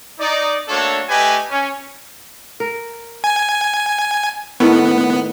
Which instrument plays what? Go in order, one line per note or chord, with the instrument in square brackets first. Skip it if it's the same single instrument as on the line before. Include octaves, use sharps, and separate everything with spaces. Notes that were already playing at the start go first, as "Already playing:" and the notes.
[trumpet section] D#4 D5
A3 A#3 D4 F#4 A4 C#5
A3 G4 B4 D#5 G#5
C#4
[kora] A#4
[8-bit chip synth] G#5
[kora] A2 D#3 A4 [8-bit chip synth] B3